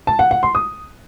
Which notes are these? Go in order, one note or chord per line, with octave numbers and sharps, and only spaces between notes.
A5
F#5
F#5
C6
D#6